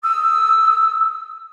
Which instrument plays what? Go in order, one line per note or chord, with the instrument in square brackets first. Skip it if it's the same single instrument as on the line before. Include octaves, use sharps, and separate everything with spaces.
[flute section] D#6 E6